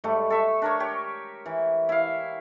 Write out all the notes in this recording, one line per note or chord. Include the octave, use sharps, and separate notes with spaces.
G#2 G3 A3
A4 E5 C#6
D4 A#4 C#5
G4 C#5
E3
E4 F5